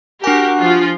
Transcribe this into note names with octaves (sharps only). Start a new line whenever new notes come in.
D4 F#4 G4 A#4 G#5
F3 F4